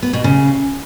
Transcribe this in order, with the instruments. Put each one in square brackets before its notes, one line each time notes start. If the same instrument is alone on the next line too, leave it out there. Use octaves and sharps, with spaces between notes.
[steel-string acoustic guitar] B3
B2
C#3